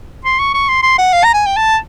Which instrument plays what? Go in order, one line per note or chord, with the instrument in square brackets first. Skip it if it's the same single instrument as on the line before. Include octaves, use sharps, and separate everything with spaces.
[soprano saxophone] C6
C#6
C#6
C6
C6
F#5
F5
A#5
G#5
G5
A5